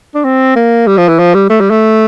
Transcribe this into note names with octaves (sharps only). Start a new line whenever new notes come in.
D4
C4
A#3
G3
F3
E3
F3
G3
A3
G3
A3